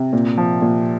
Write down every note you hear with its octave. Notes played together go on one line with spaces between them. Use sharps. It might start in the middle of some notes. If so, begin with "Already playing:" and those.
Already playing: C3
A#2
F3
A#2